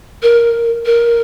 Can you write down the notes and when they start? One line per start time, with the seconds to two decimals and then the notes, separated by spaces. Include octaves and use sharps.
0.22 A#4
0.85 A#4